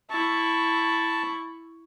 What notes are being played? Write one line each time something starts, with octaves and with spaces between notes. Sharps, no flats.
E4 A5 C#6